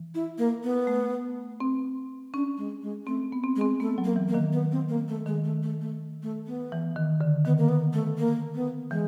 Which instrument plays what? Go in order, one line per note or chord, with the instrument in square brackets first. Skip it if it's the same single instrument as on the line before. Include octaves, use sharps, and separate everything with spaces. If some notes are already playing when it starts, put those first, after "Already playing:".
Already playing: [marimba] E3
[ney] E4
A#3
B3
[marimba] A3
C4
[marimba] C#4 [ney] D4
[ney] G#3
G#3
[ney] A3 [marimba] C4
[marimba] B3
C4
[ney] G#3
[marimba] C4
[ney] A3 [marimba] B3
[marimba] F#3
[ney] A#3
[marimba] E3
[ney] A#3
[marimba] D#3
[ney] B3
C4
A#3
A3
[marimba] D#3 [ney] G#3
[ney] A3
A3
A3
A3
B3
[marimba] E3
D#3
D3
[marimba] D#3 [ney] B3
[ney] A#3
B3
A3
A#3
B3
[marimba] E3 [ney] G#3